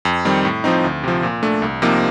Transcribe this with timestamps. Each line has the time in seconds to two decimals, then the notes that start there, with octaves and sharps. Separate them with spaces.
0.05 F2
0.25 D#3 G3 C4
0.45 A2
0.64 F3 C4 D#4
0.84 D2
1.04 C3 F3
1.23 A#2
1.43 A3 D4
1.62 C2
1.82 C3 F3 A#3 D#4